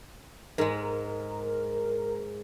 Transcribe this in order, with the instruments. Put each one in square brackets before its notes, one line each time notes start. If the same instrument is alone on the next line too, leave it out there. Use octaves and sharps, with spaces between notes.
[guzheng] G#2 G#3 [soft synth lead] A#4